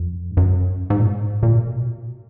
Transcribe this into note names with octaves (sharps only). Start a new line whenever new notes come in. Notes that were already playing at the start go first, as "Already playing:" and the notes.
Already playing: F2
G#2
F#2
G#2
A#2
G#2
A#2
B2